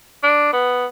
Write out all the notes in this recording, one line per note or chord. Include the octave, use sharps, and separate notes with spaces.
D4
B3